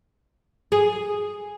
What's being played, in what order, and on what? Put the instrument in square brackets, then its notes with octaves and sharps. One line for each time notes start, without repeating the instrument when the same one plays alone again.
[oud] G#4